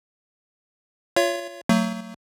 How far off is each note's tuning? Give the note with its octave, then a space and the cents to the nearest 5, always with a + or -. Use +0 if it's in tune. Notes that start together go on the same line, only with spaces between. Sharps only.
F4 +0 C#5 +15 E5 +45
F#3 +5 A3 +40